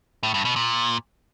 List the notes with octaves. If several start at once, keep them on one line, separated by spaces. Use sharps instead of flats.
A2
G2
B2
A#2